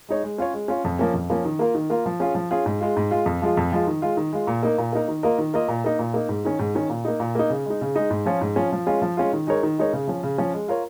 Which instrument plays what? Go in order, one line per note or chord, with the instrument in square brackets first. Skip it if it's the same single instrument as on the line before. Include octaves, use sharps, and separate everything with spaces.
[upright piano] G#3 D#4 C#5
G#3
C#4 F4 C#5
G#3
C#4 F4 C#5
F2
F3 A#3 C#4
F2
F3 A#3 C#4
D#3
A#3 F4 A#4
D#3
A#3 F4 A#4
F3
C#4 F4 G#4
F3
C#4 F4 G#4
G#2
G#3 F4
G#2
G#3 F4
F2
F3 G#3 F4
F2
F3 G#3 F4
D#3
G#3 F4
D#3
G#3 F4
A#2
A#3 D#4 A#4
A#2
A#3 D#4 A#4
D#3
A#3 F4 A#4 D#5
D#3
A#3 F4 A#4 D#5
A#2
A#3 D#4
A#2
A#3 D#4
G#2
D#3 C#4
G#2
D#3 C#4
A#2
A#3 D#4
A#2
A#3 D#4
C#3
G#3 D#4
C#3
G#3 D#4
G#2
F3 C#4 F4
G#2
F3 C#4 F4
F3
G#3 C#4 F4
F3
G#3 C#4 F4
D#3
G#3 D#4 A#4 C#5
D#3
G#3 D#4 A#4 C#5
C#3
F3 C#4
C#3
F3 C#4
G#3
F4 A#4 C#5